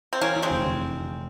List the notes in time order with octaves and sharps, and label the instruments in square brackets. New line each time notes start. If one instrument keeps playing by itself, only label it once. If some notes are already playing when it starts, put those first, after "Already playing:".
[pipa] C4
[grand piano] E3 [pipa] A#3 C#4
[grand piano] E3
[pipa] G#3 C4
[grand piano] F1
F1